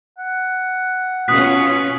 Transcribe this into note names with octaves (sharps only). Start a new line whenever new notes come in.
F#5
B2 C#4 F4 D#6 F#6 B6